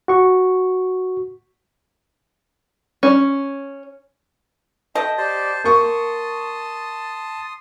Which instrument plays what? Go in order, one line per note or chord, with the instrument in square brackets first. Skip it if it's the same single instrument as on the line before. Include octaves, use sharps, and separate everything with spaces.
[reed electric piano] F#4 C#6
[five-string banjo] C#4
[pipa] A4 D#5 [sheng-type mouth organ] E5 [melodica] G5
[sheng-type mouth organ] G4 D5 [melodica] C5 A5
[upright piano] A#3 C#6 [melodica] A5 [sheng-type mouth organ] C6 D#6